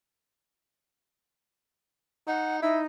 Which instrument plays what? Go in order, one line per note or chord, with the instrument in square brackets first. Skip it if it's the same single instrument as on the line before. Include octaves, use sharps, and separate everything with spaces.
[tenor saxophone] D#4 [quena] F#5
[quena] D#4 [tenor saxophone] E4